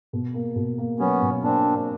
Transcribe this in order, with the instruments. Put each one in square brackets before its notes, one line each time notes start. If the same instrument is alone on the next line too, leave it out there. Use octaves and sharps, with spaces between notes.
[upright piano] B2
A#3
B2
A#3
[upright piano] F#3 [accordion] B3 C#4
[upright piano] B2
[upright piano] A#3 [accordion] C4 D4
[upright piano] A#3